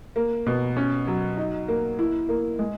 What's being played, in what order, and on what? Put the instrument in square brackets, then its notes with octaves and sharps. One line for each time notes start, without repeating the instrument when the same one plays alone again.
[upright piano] A#3
B2
C#4
F#3
D#4
A#3
E4
A#3
G#3